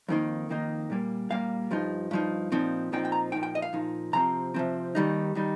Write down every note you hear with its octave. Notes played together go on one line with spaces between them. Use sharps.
F2 D#3 A#3 D#4
F2 D#3 A#3 D#4
A#2 G3 A#3
A#2 G3 A#3 F5
G2 F3 D#4
G2 F3 D#4
A#2 F3 C4 D#4
A#2 F3 C4 D#4 G5
G5
A#5
A#2 F3 D#4 G5
G5
D#5
F5
A#2 F3 D#4
C3 F3 C4 A#5
C3 F3 C4
D#2 D#3 G3 D#4
D#3 G3 D#4